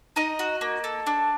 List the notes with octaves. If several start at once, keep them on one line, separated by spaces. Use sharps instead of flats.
D#4 D#5
F#4
A#3
A4
D4